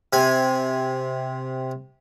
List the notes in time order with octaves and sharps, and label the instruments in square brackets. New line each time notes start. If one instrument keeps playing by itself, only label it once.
[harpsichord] C3 G#5